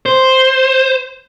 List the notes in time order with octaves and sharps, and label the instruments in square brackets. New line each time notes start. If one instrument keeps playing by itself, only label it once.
[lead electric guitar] C5